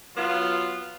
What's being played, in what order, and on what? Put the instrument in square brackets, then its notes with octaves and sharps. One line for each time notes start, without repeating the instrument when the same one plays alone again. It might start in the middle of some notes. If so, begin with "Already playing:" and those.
[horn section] F#3 B3 F4